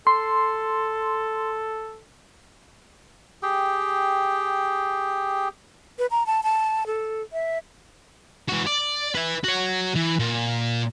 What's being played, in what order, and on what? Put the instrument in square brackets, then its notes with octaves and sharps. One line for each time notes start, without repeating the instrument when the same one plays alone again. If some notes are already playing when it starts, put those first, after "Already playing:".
[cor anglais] A4 [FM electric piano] C6
[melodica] G4 G#4 G5
[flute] B4
A#5
A5
A5
A4
E5
[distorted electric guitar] E3 F#4
D5
B4 E5
F#4 C#5
E3
A#2